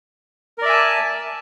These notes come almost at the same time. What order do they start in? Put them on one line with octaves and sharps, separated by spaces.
A#4 D5 E5 G#5 A5